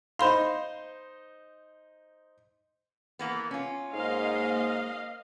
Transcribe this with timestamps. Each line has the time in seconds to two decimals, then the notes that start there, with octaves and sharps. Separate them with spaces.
0.19 D#4 C5 F5 B5 C6
3.19 E3 A#3 B3
3.51 C#4 F4
3.94 G#2 A#3 D#5 F5